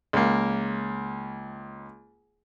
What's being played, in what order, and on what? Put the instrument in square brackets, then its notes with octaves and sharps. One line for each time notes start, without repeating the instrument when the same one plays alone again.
[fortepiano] C#2 A#3